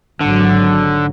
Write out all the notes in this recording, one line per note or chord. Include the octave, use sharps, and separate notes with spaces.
G#1 G#2 D3 F#3